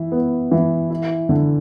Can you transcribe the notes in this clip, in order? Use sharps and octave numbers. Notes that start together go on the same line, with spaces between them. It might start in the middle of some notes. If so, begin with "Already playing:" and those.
Already playing: E3 E4
B3
E3
E4
D3